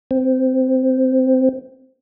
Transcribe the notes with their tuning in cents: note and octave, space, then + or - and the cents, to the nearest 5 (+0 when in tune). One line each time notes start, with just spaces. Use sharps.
C4 -10